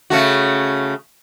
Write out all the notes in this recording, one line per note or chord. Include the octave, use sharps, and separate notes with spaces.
C#3 A3 F#4